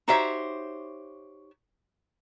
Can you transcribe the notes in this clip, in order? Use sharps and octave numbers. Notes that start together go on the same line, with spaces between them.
D#4 F#4 G4 C5 C#5 E5